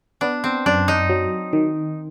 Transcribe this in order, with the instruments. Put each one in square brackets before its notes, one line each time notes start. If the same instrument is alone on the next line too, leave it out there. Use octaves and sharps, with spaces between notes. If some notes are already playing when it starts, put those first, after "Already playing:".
[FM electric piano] B3 [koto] D4
[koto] C4
[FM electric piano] F#2 [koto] D4
[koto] D#4
[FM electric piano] F#3
D#3